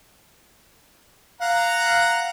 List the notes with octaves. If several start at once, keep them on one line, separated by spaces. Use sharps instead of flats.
F5 F#5 A#5